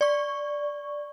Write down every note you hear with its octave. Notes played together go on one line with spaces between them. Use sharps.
D5 C#6